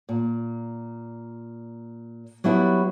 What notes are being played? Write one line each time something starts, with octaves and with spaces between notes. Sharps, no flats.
A#2
F#3 G3 B3 E4 F#4